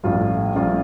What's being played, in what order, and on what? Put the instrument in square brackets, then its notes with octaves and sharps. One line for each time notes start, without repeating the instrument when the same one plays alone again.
[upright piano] A#1 A2 G3 C#4 F4
A#1 A2 G3 C#4 F4